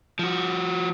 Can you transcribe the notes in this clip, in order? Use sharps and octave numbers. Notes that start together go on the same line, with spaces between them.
F3 F#4